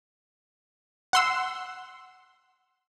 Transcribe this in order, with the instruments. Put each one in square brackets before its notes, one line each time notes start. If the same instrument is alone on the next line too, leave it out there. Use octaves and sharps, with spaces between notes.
[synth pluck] F#5 C6 E6